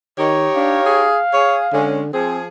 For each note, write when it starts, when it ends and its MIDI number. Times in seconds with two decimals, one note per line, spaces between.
0.18 0.47 51
0.18 1.06 63
0.18 1.06 67
0.18 1.06 73
0.56 0.79 62
0.56 1.90 77
0.86 1.19 68
1.33 1.66 68
1.33 1.57 73
1.73 2.09 50
1.73 2.01 56
1.73 2.01 61
2.13 2.48 53
2.13 2.39 60
2.13 2.48 68